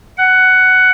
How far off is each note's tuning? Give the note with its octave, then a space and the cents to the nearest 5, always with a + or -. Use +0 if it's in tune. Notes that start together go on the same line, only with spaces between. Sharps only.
F#5 +10